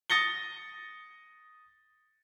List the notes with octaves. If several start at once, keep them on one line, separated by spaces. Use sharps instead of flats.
D#6 A6 A#6 C#7 G7